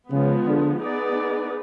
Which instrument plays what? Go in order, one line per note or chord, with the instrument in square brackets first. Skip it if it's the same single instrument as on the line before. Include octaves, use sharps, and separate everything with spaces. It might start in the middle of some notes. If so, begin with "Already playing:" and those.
[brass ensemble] C#3 [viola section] F3 G#3 B3
[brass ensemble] D3
[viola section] B3 D#4 G#4 B4 D5